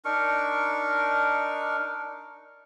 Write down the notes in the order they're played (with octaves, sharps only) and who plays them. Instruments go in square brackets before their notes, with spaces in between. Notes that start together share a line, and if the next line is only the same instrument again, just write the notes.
[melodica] D4 D#4 A#4 C#6